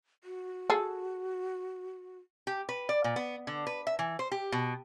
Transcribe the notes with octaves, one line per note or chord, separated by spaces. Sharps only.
F#4
G#4 A4
G4
B4
D5
A#2
B3
D3
B4
E5
E3
C5
G4
B2